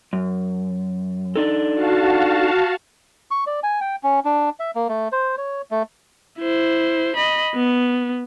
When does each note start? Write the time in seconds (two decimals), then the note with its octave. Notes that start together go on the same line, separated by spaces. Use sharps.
0.13 F#2
1.36 D4 D#4 A4
1.74 F#4 F5 A5
3.31 C#6
3.47 D5
3.63 G#5
3.81 G5
4.03 C#4
4.25 D4
4.60 E5
4.75 A#3
4.89 A3
5.12 C5
5.38 C#5
5.71 A3
6.39 E4 C5
7.16 D#5 B5
7.55 B3